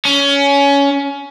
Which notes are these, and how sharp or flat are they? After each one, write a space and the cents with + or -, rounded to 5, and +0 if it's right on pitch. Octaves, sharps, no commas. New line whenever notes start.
C#4 +20